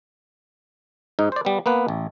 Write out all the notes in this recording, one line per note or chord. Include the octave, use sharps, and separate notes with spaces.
G#2 D#4
C5 D5
G3 B3
A#3 B3 B4
A1